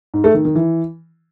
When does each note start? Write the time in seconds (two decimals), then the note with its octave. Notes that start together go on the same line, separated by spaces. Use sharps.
0.14 G#2
0.24 A3
0.34 D#3
0.45 D#3
0.55 E3